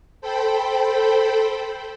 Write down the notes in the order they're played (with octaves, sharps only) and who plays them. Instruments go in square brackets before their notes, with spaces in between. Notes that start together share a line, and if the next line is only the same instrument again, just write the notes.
[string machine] A4 C5 G5 B5